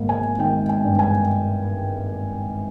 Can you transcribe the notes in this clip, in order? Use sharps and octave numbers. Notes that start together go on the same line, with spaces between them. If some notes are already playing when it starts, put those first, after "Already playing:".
Already playing: G#1 A#3
G#5
D#3 G5
G#5
G2
G#5